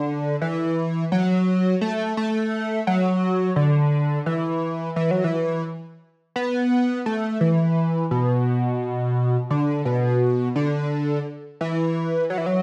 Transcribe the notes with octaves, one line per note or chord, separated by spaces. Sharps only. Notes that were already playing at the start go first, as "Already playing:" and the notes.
Already playing: D3
E3
F#3
A3
A3
F#3
D3
E3
E3
F#3
E3
B3
A3
E3
B2
D3
B2
D3
E3
F#3
E3
F#3